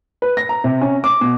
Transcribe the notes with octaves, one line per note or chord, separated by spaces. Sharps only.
B4
A#6
A#5
C3
C#4
D6
B2